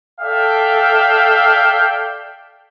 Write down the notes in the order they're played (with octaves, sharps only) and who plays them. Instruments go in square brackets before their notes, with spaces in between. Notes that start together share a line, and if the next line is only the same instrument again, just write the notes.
[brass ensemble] A4 D5 E5 F5 G5